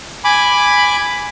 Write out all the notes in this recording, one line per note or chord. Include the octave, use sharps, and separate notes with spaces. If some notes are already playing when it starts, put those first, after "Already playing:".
G#5 B5 D6